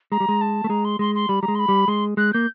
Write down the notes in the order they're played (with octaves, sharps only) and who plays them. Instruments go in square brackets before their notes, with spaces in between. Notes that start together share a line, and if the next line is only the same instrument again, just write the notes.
[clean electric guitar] G#3 [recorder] A#5
[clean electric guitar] G3
G#3
[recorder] A5
[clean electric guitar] A3
[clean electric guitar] G#3 [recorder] A#5
[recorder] C6
[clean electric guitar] G#3 [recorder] C6
[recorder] C6
[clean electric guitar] G3 [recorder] B5
[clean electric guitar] G3 [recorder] A#5
[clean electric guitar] G#3
[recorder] C6
B5
[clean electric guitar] G3
[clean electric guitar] G#3 [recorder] C6
[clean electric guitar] G#3 [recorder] F#6
[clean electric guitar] A#3 [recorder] G6